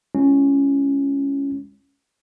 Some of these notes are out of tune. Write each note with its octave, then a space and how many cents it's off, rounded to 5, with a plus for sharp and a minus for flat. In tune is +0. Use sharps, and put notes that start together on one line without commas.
G#3 -10 C#4 +0 E4 +45